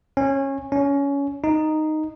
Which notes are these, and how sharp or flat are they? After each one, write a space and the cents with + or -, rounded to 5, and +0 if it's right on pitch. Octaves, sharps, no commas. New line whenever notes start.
C#4 -20
C#4 +20
D#4 -5